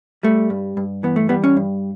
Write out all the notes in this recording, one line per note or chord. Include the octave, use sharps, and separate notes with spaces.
G3 A3
G2
G2
E3 B3
A3
G3 B3
C#4
G2